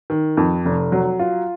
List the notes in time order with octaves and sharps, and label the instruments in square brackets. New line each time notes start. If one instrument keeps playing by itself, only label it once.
[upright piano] D#3
F2
F1
F#3
F4